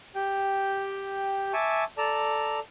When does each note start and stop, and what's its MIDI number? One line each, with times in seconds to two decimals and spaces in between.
0.15 1.52 67
0.15 1.52 79
1.53 1.84 76
1.53 1.84 80
1.53 1.84 81
1.53 1.84 85
1.53 1.84 86
1.98 2.59 69
1.98 2.59 74
1.98 2.59 81
1.98 2.59 82